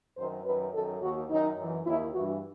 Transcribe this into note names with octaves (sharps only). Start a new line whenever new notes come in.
F#2 D#3 C5
F#2 D#3 B4
F#2 D#3 A4
D#2 D#3 F#4
F#2 D#3 D#4
F#2 E3
D#2 D#3 E4
G2 E3 F#4